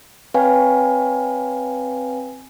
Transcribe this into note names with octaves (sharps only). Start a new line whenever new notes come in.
C4 B4 C#5 F5 G5 G#5